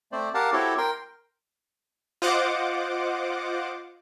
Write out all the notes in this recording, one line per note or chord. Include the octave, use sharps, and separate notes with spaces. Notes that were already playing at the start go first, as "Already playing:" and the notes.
A3 C4 C5 D5
G4 A#4 F5 F#5 A5
C4 E4 F#4 G4 A4 C#5
A#4 G5 C6
F4 C5 D#5 F#5 D6